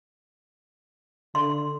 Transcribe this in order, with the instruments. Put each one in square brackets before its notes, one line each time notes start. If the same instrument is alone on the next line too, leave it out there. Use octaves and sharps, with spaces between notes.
[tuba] D3 [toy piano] C6